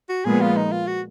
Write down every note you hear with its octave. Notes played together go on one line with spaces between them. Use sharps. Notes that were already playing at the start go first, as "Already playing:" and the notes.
F#4
A#2 F3 G#3 B3 G#4
F4
D#4
F4
F#4